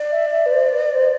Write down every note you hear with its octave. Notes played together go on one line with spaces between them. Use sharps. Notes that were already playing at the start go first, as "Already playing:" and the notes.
Already playing: D5
E5
E5
B4
C5
B4
C5